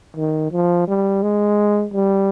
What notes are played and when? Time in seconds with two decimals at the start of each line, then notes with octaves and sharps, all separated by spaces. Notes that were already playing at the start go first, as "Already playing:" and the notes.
0.17 D#3
0.52 F3
0.88 G3
1.23 G#3
1.94 G3